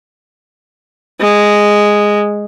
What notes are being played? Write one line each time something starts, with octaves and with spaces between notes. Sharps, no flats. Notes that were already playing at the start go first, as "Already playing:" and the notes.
G#3